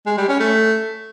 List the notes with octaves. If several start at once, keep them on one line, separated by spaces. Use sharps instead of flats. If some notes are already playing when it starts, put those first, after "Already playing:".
G#3
G3
C#4
A3